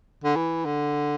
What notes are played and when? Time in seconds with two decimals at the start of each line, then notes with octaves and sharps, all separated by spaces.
0.24 D3
0.36 E3
0.65 D3